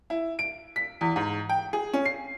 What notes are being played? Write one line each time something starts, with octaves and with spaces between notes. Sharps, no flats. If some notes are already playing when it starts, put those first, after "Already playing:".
E4
D7
B6
E2
G#2
G5
G#4
C#4
C7